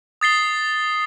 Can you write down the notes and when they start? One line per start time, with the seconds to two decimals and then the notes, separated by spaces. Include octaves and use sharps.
0.21 D#6 A6 C7 G7